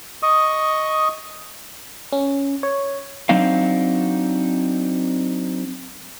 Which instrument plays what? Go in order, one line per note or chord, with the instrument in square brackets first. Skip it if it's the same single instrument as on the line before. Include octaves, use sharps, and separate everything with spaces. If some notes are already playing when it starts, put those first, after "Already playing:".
[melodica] D#5 C#6 D#6
[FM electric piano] C#4
C#5
[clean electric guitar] F#3 C4 D4 D#4 F5